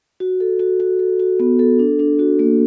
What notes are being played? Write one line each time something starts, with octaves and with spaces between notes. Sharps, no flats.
F#4
A4
F#4
F#4
A4
F#4
B3
A4
D4
D4
F#4
A#3